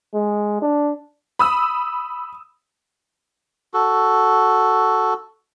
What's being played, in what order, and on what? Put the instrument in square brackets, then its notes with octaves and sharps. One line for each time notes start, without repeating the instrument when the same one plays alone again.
[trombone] G#3
D4
[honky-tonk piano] B5 D#6 E6
[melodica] F#4 A4